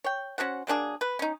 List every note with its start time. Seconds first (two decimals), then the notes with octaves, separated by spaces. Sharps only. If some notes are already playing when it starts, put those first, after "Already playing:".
0.04 C#5 G5
0.38 C#4 F#4 C5 F#5
0.67 F#3 A#3 D4 G#4
1.01 B4
1.19 C#4 D#4